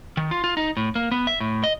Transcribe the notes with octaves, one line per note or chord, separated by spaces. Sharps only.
D#3
F4
F4
D#4
A2
A#3
B3
E5
A2
D#5